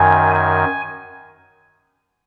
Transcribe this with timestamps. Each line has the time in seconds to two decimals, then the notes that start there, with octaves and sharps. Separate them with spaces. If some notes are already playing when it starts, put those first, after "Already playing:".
Already playing: F#2 D#3 G#5
0.35 G#5